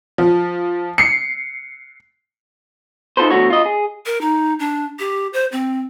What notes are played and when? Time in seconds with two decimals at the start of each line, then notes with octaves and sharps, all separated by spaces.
0.18 F3
0.98 C7 C#7
3.17 D#4 F4 F#4 A4 B4 C5
3.30 E2 D3 A3 F#4 C#5
3.50 F4 D#5
3.66 G#4
4.06 A#4
4.21 D#4
4.59 D4
4.99 G4
5.33 C5
5.52 C4